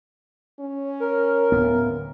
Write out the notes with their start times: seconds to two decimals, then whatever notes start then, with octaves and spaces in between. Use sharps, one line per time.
0.60 C#4
1.00 A#4
1.52 D1 B3